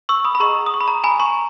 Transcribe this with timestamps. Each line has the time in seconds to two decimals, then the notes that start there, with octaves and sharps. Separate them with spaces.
0.09 C#6 E6
0.25 B5 D#6
0.35 B5
0.40 G#4 D#5 F#5 A#5 C#6
0.66 D#6
0.74 C#6
0.81 B5
0.88 A#5
1.04 G#5 B5
1.20 A#5 C#6